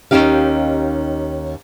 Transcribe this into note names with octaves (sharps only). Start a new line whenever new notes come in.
D#2 D3 C#4 D#4 G4 F5